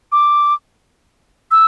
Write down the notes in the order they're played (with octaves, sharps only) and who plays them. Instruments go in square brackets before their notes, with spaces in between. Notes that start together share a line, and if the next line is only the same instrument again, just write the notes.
[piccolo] D6
E6